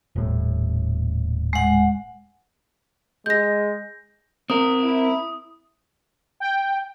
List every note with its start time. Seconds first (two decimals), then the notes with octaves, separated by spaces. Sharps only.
0.16 D#1 A2
1.53 G#3 F#5
3.26 G#3 G6 A#6
4.50 C4 A#4 D#6
4.83 E4
6.40 G5